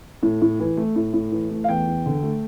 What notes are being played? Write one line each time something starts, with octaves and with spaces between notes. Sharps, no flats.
A2
A2
E3
A3
A2
A2
E3
A3
F5
E2 G5
E2
D3
A3